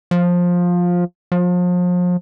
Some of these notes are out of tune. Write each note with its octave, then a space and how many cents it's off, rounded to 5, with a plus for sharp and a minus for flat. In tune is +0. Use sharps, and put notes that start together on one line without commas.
F3 +15
F3 +35